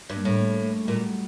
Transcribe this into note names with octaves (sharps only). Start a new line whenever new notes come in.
G2
A#3
A2
G3
A3
A#3
A3
A3
A#2 G3
F#3
G3